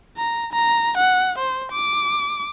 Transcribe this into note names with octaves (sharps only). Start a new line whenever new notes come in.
A#5
A#5
F#5
C5
D6